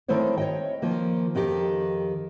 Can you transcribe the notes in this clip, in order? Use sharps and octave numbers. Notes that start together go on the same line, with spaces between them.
D#3 A3 C4 E4 C5 C#5
C#5 D#5 G5
D#3 F3 A#3
F2 D#3 D#4 F#4 G4